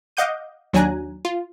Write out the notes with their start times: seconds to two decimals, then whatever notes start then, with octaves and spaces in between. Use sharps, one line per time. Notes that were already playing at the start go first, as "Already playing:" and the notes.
0.17 D#5 F5 F#5 D6 G6 D#7
0.73 D#2 F#3 D4 G#5 A#5 F#6
1.25 F4